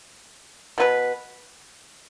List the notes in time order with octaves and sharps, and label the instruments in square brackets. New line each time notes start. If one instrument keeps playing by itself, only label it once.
[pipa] B2 B3 E4 B4